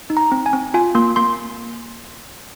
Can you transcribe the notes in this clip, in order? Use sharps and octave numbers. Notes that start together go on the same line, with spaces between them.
D#4
A#5
C4
G#5
C4
F4 G#5
A#3 C6
A#3 C6